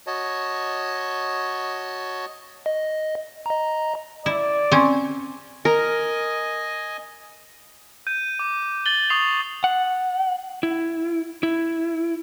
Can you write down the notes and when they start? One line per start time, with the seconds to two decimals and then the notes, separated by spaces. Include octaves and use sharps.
0.07 F#4 C#5 D#5 A5
2.66 D#5
3.46 D#5 A#5
4.26 E4 D5
4.72 C4 C#4
5.65 A#4 D#5 G#5
8.07 G6 D#7
8.39 D6
8.86 G6 A6 F#7 G7
9.10 C#6 D#6 C7 F7 F#7
9.64 F#5
10.63 E4
11.43 E4